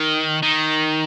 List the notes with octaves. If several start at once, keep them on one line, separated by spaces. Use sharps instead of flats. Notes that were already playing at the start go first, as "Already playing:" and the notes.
Already playing: D#3
D#3